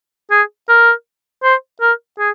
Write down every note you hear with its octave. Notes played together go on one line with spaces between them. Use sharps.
G#4
A#4
C5
A#4
G#4